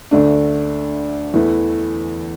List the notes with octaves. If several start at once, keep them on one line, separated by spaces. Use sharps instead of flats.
D2 D3 A3 D4
E2 E3 A3 E4